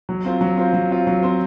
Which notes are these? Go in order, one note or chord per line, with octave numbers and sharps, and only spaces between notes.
F#3
C4 F4 C5
F#3
C4 F4 C5
F#3
C4 F4 C5
F#3
C4 F4 C5